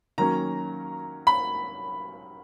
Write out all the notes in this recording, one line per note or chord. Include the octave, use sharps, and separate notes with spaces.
D#3 F#3 A#3 C#4 A#5
B5